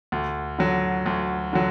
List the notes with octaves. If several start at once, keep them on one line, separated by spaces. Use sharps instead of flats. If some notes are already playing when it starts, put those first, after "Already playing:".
D2
D3 F#3
D2
D3 F#3